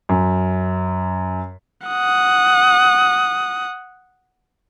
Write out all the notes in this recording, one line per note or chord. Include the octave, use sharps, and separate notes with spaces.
F#2
F#5 D#6